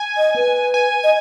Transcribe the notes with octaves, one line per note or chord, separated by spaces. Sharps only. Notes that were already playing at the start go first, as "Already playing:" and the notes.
Already playing: G#5
D#5
B4
G#5
D#5